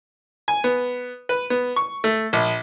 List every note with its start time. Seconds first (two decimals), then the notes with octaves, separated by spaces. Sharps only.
0.48 G#5
0.64 B3
1.29 B4
1.50 B3
1.76 C#6
2.04 A3
2.33 A#1